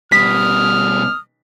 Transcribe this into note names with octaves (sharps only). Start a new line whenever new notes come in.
B2 G3 D#6 F6 B6